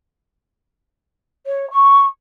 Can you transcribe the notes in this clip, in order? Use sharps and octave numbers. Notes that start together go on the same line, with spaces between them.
C#5
C#6